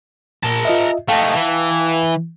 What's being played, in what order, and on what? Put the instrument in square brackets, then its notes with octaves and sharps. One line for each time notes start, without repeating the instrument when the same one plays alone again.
[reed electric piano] A#2 [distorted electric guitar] A#4 A5
[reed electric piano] F4 D#5 E5
[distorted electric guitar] A3 D#4 [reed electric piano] F5 G5 A5
[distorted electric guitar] E3